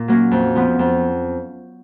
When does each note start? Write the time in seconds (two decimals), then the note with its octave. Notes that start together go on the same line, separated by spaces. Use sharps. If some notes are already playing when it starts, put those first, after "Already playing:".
Already playing: A#2
0.08 F#3 A#3 C#4
0.31 F2
0.56 F3 B3
0.79 F2